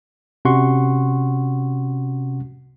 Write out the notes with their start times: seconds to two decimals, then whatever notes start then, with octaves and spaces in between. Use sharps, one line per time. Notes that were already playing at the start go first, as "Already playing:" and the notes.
0.45 C3 C#4 F#4 F#5 C6 C#6